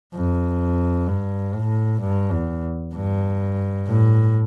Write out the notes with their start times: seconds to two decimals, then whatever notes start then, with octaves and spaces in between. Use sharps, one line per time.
0.14 F2
1.08 G2
1.55 A2
2.00 G2
2.31 E2
2.94 G2
3.87 A2